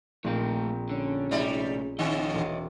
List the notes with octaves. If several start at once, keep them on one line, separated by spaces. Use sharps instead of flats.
A#1 D#3 A3 C4 F5
D3 C#4
A2 C3 G3 D#4 G#4 D5
D3 C4 C#5 D#5
E1 D6